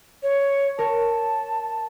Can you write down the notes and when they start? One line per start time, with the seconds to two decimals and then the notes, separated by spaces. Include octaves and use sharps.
0.23 C#5
0.79 A#4 C#5 A5